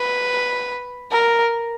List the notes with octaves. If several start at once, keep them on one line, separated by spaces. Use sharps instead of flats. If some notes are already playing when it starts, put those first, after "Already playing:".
Already playing: B4
A#4